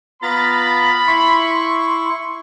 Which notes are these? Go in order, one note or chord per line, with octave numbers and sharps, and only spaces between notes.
B3 F4 A#5 B5 A6
E4 C6 C#6